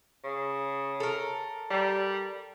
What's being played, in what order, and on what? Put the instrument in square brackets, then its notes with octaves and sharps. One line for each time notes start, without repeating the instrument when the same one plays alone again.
[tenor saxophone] C#3
[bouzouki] A4 A#4
[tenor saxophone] G3